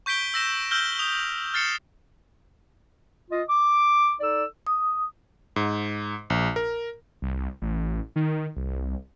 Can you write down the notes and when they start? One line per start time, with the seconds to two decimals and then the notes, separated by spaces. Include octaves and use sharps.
0.06 C#6 G6 B6 D7 G7
0.34 E6 A#6 E7
0.71 E6 F6 G6 G7
0.99 D#6 F7
1.54 F6 A6 C7 C#7 E7
3.30 F4 D#5
3.48 D6
4.20 D#4 A4 D5 E6
4.67 D#6
5.56 G#2
6.30 A#1
6.56 A#4
7.22 C2
7.62 A1
8.16 D#3
8.56 C2